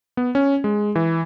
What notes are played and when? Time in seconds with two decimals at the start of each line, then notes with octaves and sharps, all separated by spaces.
0.17 B3
0.35 C#4
0.64 G#3
0.95 E3